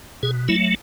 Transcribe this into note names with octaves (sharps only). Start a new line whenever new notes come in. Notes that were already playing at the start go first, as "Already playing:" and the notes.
B2 G#4
F#3 A3 E4